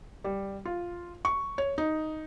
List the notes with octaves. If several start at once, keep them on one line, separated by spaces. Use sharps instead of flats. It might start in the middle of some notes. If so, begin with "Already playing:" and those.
G3
F4
C#6
C#5
D#4